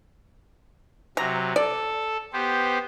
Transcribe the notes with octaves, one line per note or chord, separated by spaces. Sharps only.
C3 F#3 A#5
A4 D5
B3 G4 C5